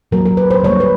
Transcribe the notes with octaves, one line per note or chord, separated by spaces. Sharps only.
D3 F#3 A#3 A#4
A#4
B4
C5
D3 G3 A#3 C#5
B4